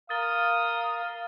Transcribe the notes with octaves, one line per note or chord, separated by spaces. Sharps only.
A#4 F5 D#6 A6 G7